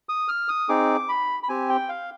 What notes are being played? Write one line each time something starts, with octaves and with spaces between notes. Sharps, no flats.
D#6
F6
D#6
C4 D#4 G#4 D6
B5
B5
C4 G4 G#5
G5
F5